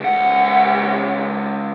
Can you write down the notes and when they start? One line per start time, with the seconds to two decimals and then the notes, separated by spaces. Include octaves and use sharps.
0.01 C#2 F#5